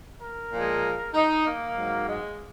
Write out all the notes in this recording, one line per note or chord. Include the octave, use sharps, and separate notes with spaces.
A#4
A#2 F3 G#3
D#4
A#3
G#2 F#3
G#3